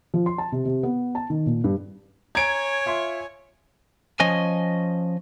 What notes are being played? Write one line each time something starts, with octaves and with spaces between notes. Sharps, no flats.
F3
C6
A5
C3
C3
B3
A5
D#3
A#2
G2
C#5 G#5 A#5 G#6 D7
F4 E5 C6
F3 C#4 D#5 G#5